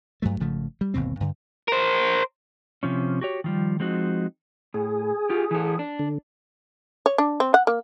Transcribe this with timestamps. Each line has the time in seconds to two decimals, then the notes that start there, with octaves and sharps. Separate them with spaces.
0.22 G2 F#3 A3
0.40 G#1 C#3 F3 A3
0.81 G3
0.94 G1 D#2 B2 C4
1.20 G2 D3
1.68 A#4 C5
2.83 C3 F3 C#4
3.21 F#4 G4 C#5
3.44 D#3 F3 G3
3.80 F3 G#3 C4 D#4 F#4
4.74 A2 G#4
5.30 F4 G4
5.51 E3 A4
5.79 D4
5.99 D3
7.06 C#5
7.18 D4
7.40 C4
7.54 F#5
7.67 A#3